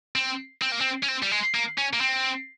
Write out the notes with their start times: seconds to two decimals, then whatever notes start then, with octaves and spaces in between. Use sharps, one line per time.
0.16 C4
0.62 C4
0.72 A#3
0.81 C4
1.03 C#4
1.08 C4
1.22 G3
1.31 G#3
1.55 A#3
1.78 C#4
1.93 A#3
2.01 C4